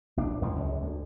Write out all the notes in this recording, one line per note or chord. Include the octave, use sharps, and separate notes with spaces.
A#1 D4
F#2 A2 D3 F3
C#2 F#2 G#3
D2